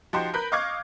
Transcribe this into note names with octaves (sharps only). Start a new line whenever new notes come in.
F3 D#4 F#4 G4 C5
A#4 B4 B5 F#6 G6
D#5 F5 C#6 D6 F6 G#6